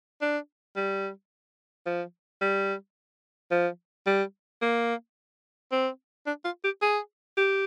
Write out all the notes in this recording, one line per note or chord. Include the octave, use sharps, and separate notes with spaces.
D4
G3
F3
G3
F3
G3
A#3
C4
D4
F4
G4
G#4
G4